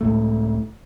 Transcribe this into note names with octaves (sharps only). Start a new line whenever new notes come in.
C#2 A2 A3